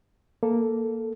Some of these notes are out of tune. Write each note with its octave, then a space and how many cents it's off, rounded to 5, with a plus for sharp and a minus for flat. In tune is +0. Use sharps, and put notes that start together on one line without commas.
A#3 +0 A4 +0